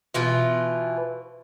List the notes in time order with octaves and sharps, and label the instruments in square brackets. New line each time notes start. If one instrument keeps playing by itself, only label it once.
[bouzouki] B2 E3 F4